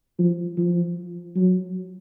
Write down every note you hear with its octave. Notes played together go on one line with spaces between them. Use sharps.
F3
F3
F#3